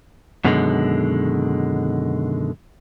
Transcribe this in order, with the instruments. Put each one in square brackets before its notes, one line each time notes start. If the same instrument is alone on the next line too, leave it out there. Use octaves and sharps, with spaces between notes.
[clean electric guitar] F#2 B2 D3 D#3 G3 G#3